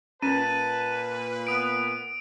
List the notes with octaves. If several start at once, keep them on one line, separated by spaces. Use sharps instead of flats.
A#2 C#4 B4 A5 D#7
B3 D#6 D7